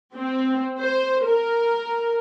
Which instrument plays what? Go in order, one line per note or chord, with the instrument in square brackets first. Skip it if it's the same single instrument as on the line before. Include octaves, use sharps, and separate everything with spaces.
[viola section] C4
C5
A#4